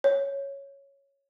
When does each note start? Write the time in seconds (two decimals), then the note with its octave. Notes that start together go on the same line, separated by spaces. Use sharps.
0.04 C#5